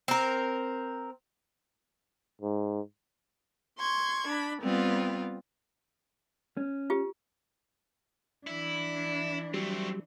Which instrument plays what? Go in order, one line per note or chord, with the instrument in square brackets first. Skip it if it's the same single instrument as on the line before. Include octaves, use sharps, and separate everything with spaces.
[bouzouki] C4 A#4
[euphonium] G#2
[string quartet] C6 C#6 G#6
D4 B5
G3 B3 C4 F4
[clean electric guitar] C#4
[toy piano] F4 G4
[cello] E3 D4 [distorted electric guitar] E4
[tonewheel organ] F#3 G3 [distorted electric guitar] A3 C4